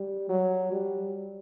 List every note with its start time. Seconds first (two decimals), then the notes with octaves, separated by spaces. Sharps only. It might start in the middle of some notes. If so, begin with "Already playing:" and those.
Already playing: G3
0.29 F#3
0.72 G3